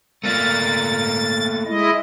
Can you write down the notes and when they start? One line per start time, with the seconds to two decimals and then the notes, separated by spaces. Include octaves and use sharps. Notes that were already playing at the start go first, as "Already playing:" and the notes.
0.24 A3 A#3 F4 A6
1.66 G#3 E4 D#5